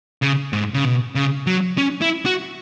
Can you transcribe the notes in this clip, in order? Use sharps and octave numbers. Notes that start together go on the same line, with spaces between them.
C#3
G#2
C#3
B2
C#3
F#3
C#4
E4
F#4